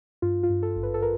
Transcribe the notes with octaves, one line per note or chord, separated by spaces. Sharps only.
G2 F4
F4
G2
A4
G#1
B4
A4
A#4